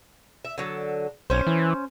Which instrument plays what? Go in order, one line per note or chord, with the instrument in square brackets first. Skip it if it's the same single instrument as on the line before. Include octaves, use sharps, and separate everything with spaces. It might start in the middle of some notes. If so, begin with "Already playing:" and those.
[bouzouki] E5
D3 F#3 A4
[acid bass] B1 [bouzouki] C#4 C5
[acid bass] E3